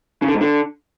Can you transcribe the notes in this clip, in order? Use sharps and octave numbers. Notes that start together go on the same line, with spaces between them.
C#3
D3
G#2
D3